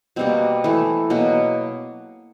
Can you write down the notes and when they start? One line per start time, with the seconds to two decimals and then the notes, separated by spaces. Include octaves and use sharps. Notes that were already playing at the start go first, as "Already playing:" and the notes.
0.16 B2 G3 A#3 C4
0.64 E3 A3
1.10 B2 F#3 A#3